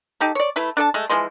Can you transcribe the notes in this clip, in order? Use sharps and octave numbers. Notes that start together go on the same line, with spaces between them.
D#4 G4 A4
C#5 D5
A3 E4 B4
D4 A4 E5 A5
G#3 A3
E3 F3 G#3 C6